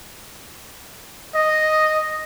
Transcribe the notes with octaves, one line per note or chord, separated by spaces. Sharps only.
D#5